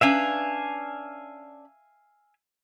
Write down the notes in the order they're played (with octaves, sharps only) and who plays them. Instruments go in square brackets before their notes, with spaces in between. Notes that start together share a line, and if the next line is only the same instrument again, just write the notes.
[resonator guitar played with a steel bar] C#4 D4 B4 [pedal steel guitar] E5 F5 G#5